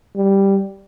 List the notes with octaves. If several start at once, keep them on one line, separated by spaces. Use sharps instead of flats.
G3